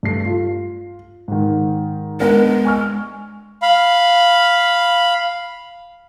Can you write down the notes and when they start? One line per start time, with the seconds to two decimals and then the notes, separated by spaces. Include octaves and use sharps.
0.03 G2 A3 C7
0.25 F4
1.28 G#2 D#3
2.20 G#3 B3 D4 A#4
2.65 G#5 C#6 F6
3.62 F5 B5